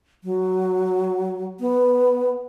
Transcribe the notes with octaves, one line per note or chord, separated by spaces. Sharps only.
F#3
B3